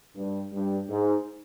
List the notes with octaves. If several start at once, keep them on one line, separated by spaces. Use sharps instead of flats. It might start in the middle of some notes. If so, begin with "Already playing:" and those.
G2
G2
G#2